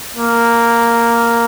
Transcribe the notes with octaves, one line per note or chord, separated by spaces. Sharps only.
A#3